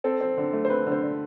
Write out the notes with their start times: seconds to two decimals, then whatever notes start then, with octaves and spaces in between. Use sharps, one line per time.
0.04 C4 A4
0.21 C4
0.37 D3
0.53 A3
0.65 C5
0.70 C4 B4
0.86 D3
0.92 C5
1.03 D3